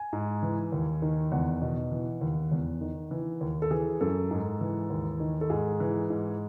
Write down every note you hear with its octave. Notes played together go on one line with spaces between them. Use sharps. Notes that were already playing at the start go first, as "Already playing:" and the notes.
Already playing: G#5
G#2
E3
D#2
D#3
E2 F#5
B2
E3
D#2
E2
D#3
E3
D#2
A4
E3 G#4
F#2 A4
G#2
E3
D#2
D#3
A4
G#2 G#4
E3
G#2